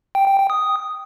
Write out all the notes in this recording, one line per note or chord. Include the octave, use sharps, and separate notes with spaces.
G5
G5
G5
D#6